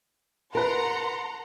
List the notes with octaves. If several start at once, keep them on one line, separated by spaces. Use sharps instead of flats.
A#4 B4 F#5 A5 A#5 C6